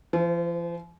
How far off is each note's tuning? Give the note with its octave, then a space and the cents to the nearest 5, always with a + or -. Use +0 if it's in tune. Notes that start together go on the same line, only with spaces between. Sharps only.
F3 -40 C5 +0